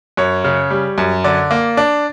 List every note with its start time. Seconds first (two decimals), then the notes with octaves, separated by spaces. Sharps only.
0.17 F#2 C#5
0.44 C#3
0.71 G3
0.98 F#2
1.24 D3 D5
1.51 A#3
1.77 D4